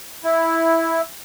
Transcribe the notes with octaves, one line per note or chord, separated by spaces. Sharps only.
E4